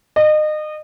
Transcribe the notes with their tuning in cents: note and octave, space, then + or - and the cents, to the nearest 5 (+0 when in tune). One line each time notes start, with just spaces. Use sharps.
D#5 -30